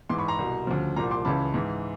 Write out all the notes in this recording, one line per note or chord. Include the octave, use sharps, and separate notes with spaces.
G#2 E3 C6 D6
B5 C#6
A#5 C6
C2 B2
D2 C#3 F3
C2 A#2 F3 A#5 C6
C6 D6
C#2 C#3 E3 A5 B5
G#2 E3